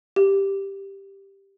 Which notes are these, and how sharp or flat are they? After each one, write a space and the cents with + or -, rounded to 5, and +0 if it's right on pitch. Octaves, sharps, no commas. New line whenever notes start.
G4 +0